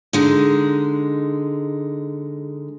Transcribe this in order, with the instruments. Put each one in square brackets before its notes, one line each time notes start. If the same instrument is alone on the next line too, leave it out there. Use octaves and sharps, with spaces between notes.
[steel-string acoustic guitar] D3 G#3 D#4